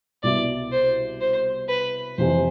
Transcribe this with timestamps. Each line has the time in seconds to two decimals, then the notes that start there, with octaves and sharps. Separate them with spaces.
0.23 C2 B2 B3 E4 D5
0.72 C5
1.21 C5
1.69 B4
2.18 F2 C3 E3 C5